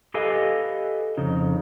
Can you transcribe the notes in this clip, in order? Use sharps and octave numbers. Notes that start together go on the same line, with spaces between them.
G4 A4 B4 D#5 F5 G#5
F2 C#3 D#4